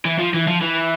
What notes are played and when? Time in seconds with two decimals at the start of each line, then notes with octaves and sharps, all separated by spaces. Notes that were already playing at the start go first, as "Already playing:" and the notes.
0.05 E3
0.19 F3
0.34 E3
0.47 F3
0.61 E3